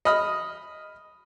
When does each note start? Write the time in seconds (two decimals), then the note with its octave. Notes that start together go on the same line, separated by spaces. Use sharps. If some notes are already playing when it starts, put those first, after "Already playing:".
0.05 D#5 B5 D#6 F6